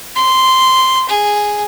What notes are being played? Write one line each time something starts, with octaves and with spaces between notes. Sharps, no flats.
C6
G#4